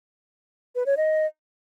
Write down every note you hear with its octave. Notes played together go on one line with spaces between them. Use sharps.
B4
C#5
D#5